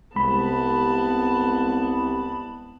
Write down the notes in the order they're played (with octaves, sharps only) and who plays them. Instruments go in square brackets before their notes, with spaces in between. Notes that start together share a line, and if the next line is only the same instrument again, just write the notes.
[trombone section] C2 [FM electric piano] G#3 B5 [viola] B3 A5